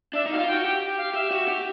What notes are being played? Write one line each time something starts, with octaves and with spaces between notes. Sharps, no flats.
D4 E5
D#4
F#4 F5
F4
G5
F#4
G4 G5
F5
G4 E5
F#4
G4